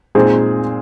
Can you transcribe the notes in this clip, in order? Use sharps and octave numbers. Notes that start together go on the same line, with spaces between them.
A#2 G#3 C4 D#4 G#4